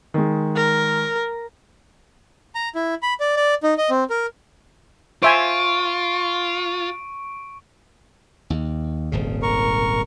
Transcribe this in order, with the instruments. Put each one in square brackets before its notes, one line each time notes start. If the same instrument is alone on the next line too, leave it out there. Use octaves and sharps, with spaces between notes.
[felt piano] D#3 G#3
[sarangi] A#4
[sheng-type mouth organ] A#5
E4
B5
D5
D5
D#4
D#5
C4
A#4
[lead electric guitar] F4 [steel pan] C5 E5 G#5 [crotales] C#6 D7
[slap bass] D#2
D#1 G#1 C#3
[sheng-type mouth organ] A#4 C#6